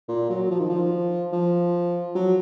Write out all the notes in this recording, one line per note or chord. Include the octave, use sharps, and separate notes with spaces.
A#2
F#3
F3
D#3
F3
F3
F#3